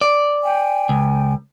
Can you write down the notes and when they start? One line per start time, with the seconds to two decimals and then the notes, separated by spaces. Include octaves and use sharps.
0.01 D5
0.43 G5 G#5
0.89 C#2